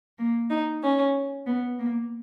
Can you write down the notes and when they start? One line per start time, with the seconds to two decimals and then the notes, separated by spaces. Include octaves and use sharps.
0.19 A#3
0.50 D#4
0.83 C#4
1.46 B3
1.79 A#3